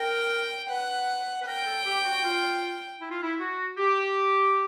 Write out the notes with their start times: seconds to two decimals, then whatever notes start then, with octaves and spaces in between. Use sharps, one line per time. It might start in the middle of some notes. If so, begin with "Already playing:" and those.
Already playing: A#4 G5
0.69 B4 F#5
1.41 B4
1.46 A#4 G5
1.66 A4
1.85 G4
2.04 F#4
2.24 F4
3.01 E4
3.11 F4
3.22 E4
3.39 F#4
3.78 G4